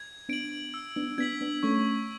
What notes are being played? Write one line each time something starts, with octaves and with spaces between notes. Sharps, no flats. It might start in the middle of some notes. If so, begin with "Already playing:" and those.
Already playing: G#6
B3 D4 D7 F#7
E6
B3 D4
B3 D4 G#6 B6 F#7
B3 D4
A3 C#4 C#6